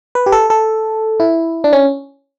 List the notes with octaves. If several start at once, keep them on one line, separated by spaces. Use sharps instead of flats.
B4
G4
A4
A4
E4
D4
C#4